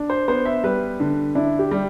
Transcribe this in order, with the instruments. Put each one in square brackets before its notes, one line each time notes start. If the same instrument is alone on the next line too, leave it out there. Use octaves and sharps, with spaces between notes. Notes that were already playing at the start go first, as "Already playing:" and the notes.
Already playing: [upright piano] D4
[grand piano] C5
[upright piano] B3 [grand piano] C5
[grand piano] E5
[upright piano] G3 [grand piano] B4
[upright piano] D3
[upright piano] D4 [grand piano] E4
[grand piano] G4
[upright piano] G3